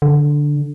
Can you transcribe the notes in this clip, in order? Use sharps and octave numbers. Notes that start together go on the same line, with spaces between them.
D3